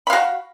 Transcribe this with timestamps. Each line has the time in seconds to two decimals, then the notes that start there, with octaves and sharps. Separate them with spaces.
0.07 B5
0.10 F5
0.13 F#4